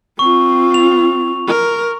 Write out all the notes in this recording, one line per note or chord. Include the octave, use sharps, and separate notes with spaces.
C4 F4 C#6
F7
A#4